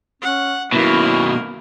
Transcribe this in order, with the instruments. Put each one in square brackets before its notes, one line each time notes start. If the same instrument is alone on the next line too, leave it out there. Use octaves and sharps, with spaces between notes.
[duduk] C#4 [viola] F#5
[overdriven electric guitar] F#2 B2 [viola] A#3 A#4 [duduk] E4